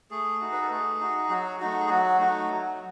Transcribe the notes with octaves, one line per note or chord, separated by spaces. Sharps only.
A3 G#4
D#4 F#4
B4
A4
A3 G#4
D#4 F#4
F#3 F#4
A3 D#4 F#4
G#4
F#3 F#4
A3 D#4 F#4
F#3